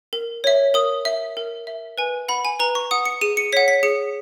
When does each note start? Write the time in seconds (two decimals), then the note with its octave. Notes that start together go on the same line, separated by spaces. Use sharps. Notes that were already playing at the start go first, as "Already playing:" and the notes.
0.13 A#4
0.44 C#5 E5
0.74 A#4 D#6
1.05 E5
1.37 A#4
1.67 E5
1.98 B4 G#5
2.28 F#5 B5
2.45 G#5
2.59 B4 A#5
2.75 C#6
2.91 F#5 D#6
3.06 C#7
3.21 G#4 D#7
3.37 C#7
3.52 C#5 F#5 B6
3.68 B6
3.83 G#4 C#7